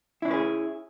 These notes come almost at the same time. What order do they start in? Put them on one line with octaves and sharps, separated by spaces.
E4 D4 C#4 B4 G#4